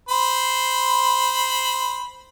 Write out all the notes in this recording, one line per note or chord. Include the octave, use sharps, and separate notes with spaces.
C5 B5